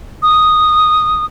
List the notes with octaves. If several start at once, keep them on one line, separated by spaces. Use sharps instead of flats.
D#6